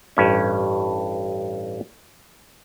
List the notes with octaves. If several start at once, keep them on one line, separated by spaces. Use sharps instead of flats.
A1 G2 C#4